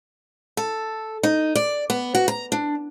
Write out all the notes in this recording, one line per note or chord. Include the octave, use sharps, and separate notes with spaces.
A4
D#4
D5
B3
F#4
A#5
D4